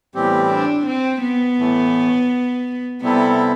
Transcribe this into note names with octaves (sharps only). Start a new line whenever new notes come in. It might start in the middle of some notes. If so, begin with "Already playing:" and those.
A2 E3 G3 B3 C4 G4
D4
C4
B3
A2 E3 A3
C3 G3 B3 C4 E4 A4